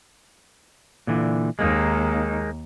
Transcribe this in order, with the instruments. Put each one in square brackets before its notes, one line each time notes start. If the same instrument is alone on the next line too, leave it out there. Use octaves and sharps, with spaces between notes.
[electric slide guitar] A#2 D3 E3
[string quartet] D#2 [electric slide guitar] G#3 A#3 D#4